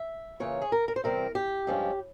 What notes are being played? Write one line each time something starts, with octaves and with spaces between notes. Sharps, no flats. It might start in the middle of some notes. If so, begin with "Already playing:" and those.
Already playing: E5
C#3 E3 A#3 F4 C#5
G#4
A#4
A#4
C5
E2 C3 G3 C4 A#4
G4
G2 F3 G#3 C#4